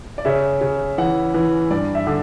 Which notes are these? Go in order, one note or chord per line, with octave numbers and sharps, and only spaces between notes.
D5
C#3 E5
C#3
E3 F#5
E3
G2 D5
E5
D3